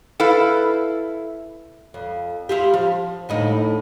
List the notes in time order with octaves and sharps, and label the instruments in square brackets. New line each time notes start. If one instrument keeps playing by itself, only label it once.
[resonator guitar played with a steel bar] E4 A4 B4 F5
[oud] F2
E4 F4 G4
F3
D2 A2 D#4